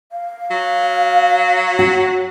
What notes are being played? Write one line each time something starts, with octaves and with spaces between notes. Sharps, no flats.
F5
F#3
F#4